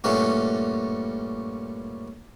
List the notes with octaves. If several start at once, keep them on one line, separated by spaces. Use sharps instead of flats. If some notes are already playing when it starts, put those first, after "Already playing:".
G2 A#2 A3 C#4 F#4